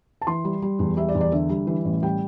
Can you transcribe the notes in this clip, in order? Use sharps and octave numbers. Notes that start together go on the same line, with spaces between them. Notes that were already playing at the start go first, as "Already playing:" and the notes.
A5
E3 C6
G3
G3
E2
G3 E5
D5
E2
D5
D3 E5
G3
E3
A1
G3 G5